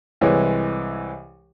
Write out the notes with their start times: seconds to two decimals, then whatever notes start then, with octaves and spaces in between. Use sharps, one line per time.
0.21 C2 E3 G#3 C#5